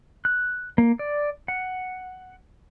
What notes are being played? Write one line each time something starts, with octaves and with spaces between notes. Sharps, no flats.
F#6
A#3
D5
F#5